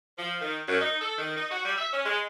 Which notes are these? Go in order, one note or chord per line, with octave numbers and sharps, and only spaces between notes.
F3
D#3
F#2
D#4
A4
D#3
D#4
F#4
G3
E5
C#4
G#3